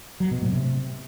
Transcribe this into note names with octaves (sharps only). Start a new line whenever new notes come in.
F#3
B2
A2
C3